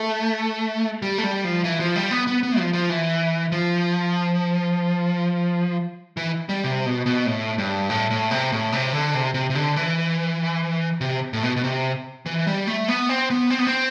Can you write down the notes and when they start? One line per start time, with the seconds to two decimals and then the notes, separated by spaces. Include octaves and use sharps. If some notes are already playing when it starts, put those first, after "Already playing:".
Already playing: A3
1.02 G3
1.18 A3
1.24 G3
1.44 F3
1.64 E3
1.80 F3
1.96 G3
2.11 B3
2.27 B3
2.43 B3
2.58 F3
2.73 F3
2.89 E3
3.52 F3
6.17 E3
6.49 G3
6.64 C3
6.86 B2
7.06 B2
7.26 A2
7.58 G2
7.90 A2
8.10 A2
8.31 C3
8.52 A2
8.72 C3
8.93 D3
9.14 C3
9.34 C3
9.50 C3
9.55 D3
9.76 E3
11.01 C3
11.33 A2
11.43 B2
11.56 B2
11.64 C3
12.26 E3
12.47 G3
12.67 A3
12.88 B3
13.09 C4
13.30 B3
13.50 C4
13.59 B3
13.67 C4